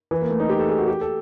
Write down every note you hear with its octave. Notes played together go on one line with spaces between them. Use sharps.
E3
A#3
A3
D#4
G4
A4
G#4
F#4
G4
A4